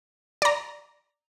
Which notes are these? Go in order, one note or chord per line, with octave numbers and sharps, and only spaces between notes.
D5 A#5